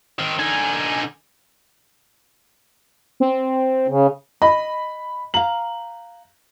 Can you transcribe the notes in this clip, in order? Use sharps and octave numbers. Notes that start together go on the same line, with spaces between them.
D#3 C4
D3 D#4 G#5
C4
C#3
D#5 B5
F5 A#5 F#7